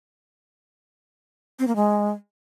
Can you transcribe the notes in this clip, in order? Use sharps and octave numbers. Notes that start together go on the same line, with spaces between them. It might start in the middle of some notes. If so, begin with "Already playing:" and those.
C4
A#3
G#3